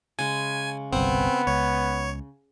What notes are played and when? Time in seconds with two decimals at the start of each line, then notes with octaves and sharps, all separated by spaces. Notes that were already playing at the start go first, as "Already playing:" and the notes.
0.19 C#3 G#3 G#5
0.92 G1 C2 B3 C4 F#5 G#5
1.47 C#2 C#5